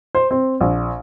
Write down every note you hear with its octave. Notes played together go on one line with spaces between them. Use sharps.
C5
C4
A#1